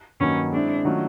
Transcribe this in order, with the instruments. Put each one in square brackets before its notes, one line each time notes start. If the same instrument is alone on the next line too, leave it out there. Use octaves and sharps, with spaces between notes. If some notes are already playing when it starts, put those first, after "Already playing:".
[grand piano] G2 D#3 F#3 A#3 [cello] C#4
[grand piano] G#3 C4 E4 [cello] D4
[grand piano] D#3 F#3 A3 C#4 F4